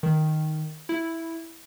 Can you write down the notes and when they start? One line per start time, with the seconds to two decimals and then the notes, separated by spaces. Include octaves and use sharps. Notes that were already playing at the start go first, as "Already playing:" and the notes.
0.03 D#3
0.89 E4